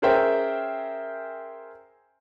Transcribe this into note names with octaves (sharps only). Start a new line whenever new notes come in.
C#4 G#4 A#4 C5 E5 G5